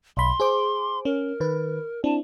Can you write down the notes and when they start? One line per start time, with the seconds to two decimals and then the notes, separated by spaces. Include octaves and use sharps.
0.17 B1 B5 C6
0.40 G#4 C5 D6
1.05 C#4 A#4
1.40 D#3 B4
2.04 C4 D4 E4 A5